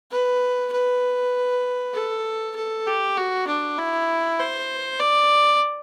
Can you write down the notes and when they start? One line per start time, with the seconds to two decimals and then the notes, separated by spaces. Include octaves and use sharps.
0.11 B4
0.72 B4
1.94 A4
2.56 A4
2.87 G4
3.17 F#4
3.47 D4
3.78 E4
4.39 C5
5.00 D5